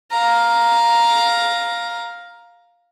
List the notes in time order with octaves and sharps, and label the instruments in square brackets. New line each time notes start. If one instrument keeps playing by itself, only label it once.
[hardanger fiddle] F5 A#5